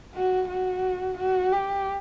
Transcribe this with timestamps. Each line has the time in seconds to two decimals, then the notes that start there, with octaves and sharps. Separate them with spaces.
0.14 F#4
0.48 F#4
1.18 F#4
1.52 G4